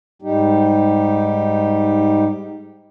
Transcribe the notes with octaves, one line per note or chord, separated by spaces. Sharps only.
G#2 G3 D#4 G4